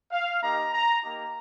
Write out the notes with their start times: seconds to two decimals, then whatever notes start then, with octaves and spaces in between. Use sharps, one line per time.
0.12 F5
0.42 A#3 D#4 G4 A#5
0.73 A#5
1.03 A#3 D#4 G4 A#5